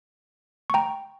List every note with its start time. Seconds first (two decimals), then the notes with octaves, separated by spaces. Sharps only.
0.70 C#6
0.74 G5 A#5